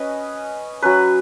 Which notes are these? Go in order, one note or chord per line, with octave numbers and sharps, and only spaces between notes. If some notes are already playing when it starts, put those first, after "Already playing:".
Already playing: C#4 B4 D#5
F#3 C#4 B4